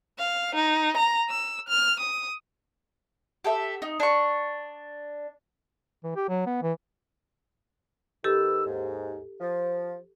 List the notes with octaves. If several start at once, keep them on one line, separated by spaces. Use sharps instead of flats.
F5
D#4
A#5
E6
F6
D#6
G4 A4 E5
D#4
D4 C#6
E3
G4
F#3
B3
E3
D#3 G4 A4 B4 E6
D#2 G#2
F3